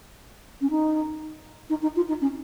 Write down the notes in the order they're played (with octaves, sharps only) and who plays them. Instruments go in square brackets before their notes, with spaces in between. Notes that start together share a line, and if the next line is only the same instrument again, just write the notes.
[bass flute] C#4
D#4
D#4
D#4
F4
D#4
C#4